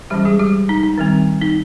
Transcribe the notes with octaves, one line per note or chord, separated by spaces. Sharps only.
E3 G3 G#3 C#4 G4
G#3 G#4
G3 G4
D#4
D#4
D#3 G3 C4
D#4